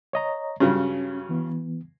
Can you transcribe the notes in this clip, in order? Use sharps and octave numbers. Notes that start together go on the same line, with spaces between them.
C#5 D#5 A#5
G2 C#3 F#3 C#4
E3 B3